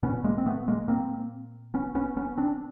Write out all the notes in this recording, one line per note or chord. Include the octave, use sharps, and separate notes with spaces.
A#2 B3 C#4
G#3 A#3
C4
A3 B3
G#3 A#3
A#3 C4
B3 C#4
B3 C#4
B3 C#4
C4 D4